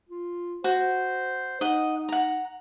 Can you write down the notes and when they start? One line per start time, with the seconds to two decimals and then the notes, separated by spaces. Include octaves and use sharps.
0.09 F4
0.64 F#4 C5
1.61 D#4 D#5 F#5
2.09 F#5 A#5